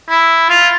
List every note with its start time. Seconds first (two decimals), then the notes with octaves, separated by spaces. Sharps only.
0.09 E4
0.50 F4